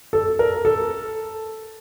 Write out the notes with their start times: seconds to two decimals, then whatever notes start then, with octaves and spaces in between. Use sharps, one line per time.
0.13 A4
0.39 A#4
0.65 A4